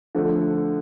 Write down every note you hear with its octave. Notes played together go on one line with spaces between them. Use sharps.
D3 F3 A3